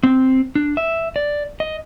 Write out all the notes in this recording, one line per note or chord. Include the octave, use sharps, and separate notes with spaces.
C4
D4
E5
D5
D#5